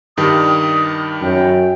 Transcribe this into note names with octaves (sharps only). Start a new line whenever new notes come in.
G2 D#3 G3 D#6
F#2 G5